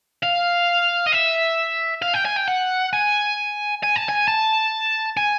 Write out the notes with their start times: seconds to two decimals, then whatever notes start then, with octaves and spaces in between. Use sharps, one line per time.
0.23 F5
1.07 D#5
1.13 E5
2.02 F5
2.14 G5
2.25 G#5
2.37 G5
2.48 F#5
2.93 G#5
3.83 G#5
3.96 A5
4.09 G#5
4.28 A5
5.17 G#5